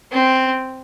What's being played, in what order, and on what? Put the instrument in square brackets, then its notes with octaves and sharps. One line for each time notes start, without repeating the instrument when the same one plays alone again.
[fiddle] C4